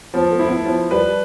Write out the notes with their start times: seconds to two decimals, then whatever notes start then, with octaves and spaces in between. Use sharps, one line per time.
0.14 F3 B3
0.31 A3
0.39 E4
0.48 B3
0.65 F3
0.91 G3 B4